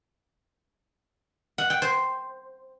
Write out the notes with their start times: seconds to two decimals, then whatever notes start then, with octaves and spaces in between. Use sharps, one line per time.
1.58 F#5
1.70 G5
1.82 C5